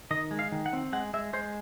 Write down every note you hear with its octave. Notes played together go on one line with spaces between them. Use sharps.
D#3 D#5
G#3
F5
D#3
F#5
C4
G#3 F#5
G#3 E5
G#3 C5